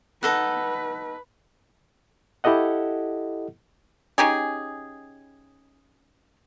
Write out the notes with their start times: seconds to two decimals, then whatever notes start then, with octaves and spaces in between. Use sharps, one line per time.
0.23 D#4 A4 B4 F#5
2.44 E4 G4 A4 D#5 F#5
4.18 C#4 D#4 G4 G#4